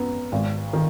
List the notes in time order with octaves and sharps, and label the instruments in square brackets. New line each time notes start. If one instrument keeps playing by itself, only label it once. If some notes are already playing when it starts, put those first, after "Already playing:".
Already playing: [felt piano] F#2 B3
G#1
D#3